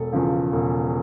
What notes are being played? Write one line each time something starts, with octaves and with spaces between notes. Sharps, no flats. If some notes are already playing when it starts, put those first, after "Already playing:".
Already playing: E1 A4
E2 C#3 F3
E1